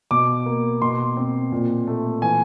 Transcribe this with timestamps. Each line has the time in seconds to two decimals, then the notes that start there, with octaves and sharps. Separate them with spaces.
0.11 B2 D6
0.46 A#3
0.81 B2 C6
1.17 C4
1.52 A#2
1.87 A3
2.22 E3 G#5